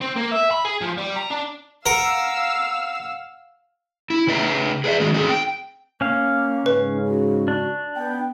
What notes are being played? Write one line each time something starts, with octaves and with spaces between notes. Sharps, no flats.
C4
A#3
E5
B5
G#4
F3
G3
A#5
D4
A#4 F5 F#5 E6 C#7
E4
C#3 B4 D#5 E5 A#5
G#4 B4 D5 E5
D#3 G#3 F#4
A3 C4 D#4 G#4
G5
A#3 C#4 F5
G#2 C#3 B4
F#4
D4
B3 G5